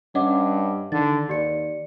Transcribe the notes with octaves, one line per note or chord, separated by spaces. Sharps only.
G2 C#4 D#5 F#5 D6
D3 D#3 A6
D#2 G4 D5 C#7